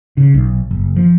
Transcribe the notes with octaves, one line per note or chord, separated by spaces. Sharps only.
C#3
B1
F#1
F3